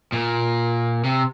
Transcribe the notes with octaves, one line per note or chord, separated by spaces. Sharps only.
A#2
C3